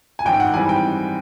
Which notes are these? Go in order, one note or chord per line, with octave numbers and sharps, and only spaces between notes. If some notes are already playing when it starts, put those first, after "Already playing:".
G#5
G#1 F#2 D#3 G5
F#5
G#2 E3 G3 C4 G#5
G5